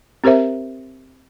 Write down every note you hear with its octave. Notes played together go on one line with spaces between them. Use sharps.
C4 G4 A#4 C5 E5